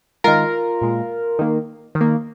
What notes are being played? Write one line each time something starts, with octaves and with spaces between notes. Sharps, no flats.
D#3 G#3 F4 A#4
A#2 G#3
D#3 A#3
D#3
A#3